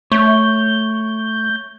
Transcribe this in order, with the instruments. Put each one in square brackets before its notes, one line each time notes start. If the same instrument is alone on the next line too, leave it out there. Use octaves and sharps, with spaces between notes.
[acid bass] A3 [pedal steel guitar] C#5 [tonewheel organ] G6